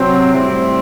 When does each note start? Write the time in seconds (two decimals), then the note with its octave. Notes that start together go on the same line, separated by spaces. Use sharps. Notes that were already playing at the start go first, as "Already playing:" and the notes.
Already playing: C3 F#3 C4
0.32 A2 G3 C4 E4